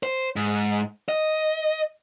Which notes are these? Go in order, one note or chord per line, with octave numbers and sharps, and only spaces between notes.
C5
G#2
D#5